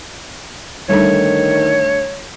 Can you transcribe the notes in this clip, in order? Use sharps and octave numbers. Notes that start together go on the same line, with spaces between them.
D3 D#3 G3 A3 D#4 C#5